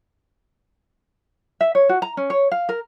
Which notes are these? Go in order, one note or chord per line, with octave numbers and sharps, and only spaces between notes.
E5
C#5
F#4
A#5
C#4
C#5
F5
A#4